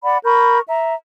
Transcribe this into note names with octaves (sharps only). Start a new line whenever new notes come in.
D5 F#5 B5
A#4 B5 C#6 G6
E5 A#5